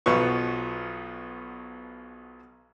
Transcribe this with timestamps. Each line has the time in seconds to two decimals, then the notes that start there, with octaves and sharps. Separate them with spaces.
0.06 B1 B2 F3 B3 C#6